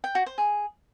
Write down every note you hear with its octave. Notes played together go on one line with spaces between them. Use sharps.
G5
F#4
C5
G#4